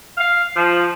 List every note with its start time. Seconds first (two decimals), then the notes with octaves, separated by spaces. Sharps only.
0.18 F5
0.55 F3